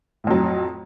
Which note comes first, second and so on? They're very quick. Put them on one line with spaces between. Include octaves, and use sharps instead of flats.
A2 F2 F#3